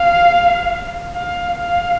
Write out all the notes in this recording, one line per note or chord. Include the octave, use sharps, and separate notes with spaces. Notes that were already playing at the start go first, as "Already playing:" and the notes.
Already playing: F5
F5
F5